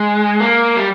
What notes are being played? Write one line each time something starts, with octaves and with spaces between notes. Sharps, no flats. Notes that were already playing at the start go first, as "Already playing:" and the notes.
Already playing: G#3
A#3
G3